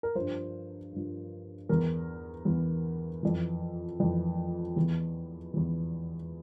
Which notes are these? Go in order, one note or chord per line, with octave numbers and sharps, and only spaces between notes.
A#4
G2 F3 C5
G2 F3
E2 E3 A#4
E2 E3
F2 E3
F2 E3
E2 E3
E2 E3